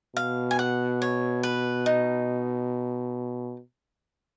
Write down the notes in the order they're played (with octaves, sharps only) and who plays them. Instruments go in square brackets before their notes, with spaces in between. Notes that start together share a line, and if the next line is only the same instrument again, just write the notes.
[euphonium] B2 [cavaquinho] F5
[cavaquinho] G#5
F#5
C#5
B4
D#4